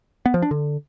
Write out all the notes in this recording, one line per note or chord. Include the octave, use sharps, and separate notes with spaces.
B3
F3
D4
D3